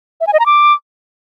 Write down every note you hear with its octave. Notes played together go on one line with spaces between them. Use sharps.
E5
G#5
D#5
A#5
D6